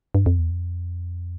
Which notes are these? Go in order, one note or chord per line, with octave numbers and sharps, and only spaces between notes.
G2
F2
E2
F2